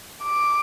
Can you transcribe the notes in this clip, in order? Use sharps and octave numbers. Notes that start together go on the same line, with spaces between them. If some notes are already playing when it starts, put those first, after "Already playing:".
D6